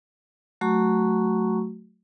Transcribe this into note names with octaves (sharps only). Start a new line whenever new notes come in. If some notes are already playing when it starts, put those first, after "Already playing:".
F#3 A3 F#4 A#5 C#6